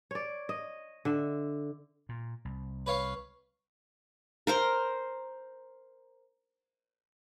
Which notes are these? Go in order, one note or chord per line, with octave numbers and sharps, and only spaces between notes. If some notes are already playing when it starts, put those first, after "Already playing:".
C#5 D5
D#5
D3 E5
A#2
C2
B4 C#5 F5
A#4 C5 A#5 C6